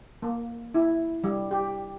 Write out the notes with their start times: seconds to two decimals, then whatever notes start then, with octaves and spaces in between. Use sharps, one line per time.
0.22 A#3
0.74 E4
1.24 G3
1.51 G4